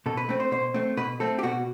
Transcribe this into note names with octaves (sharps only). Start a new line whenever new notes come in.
B2 A4
B4
A3 C4 B4
C5
B2 C5
A3 C4
B2 B4
A3 C4 A4
G4
B2 F#4